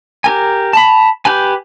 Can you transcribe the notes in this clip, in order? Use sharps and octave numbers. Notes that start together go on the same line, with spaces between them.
G4 A#4 G#5
A5 B5
G4 B4 G#5